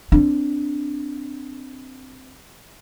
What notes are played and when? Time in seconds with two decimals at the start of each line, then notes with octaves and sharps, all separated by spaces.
0.12 C4 D4